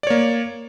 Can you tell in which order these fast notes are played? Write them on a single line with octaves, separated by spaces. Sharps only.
D5 C#5 A#3